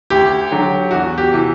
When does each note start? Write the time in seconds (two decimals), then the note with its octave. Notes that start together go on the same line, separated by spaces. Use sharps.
0.10 D2 G4
0.52 D3 F#3
0.91 E2 F#4
1.18 G4
1.31 C3 E3